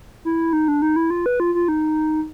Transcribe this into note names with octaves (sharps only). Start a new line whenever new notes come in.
E4
D#4
D4
D#4
E4
F4
B4
F4
F4
D#4